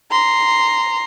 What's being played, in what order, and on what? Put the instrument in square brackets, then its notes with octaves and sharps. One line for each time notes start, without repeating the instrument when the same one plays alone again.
[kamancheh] A#5 C6